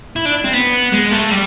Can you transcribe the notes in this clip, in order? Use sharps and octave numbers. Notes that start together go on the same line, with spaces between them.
E4
D4
C4
B3
G#3
A3
G3